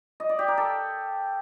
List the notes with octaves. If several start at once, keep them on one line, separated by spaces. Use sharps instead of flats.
D#5
D5
G4
A#4
A4